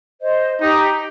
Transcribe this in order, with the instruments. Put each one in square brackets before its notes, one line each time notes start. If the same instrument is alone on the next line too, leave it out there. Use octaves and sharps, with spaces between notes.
[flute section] C5 D#5
[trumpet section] D#4 [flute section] G4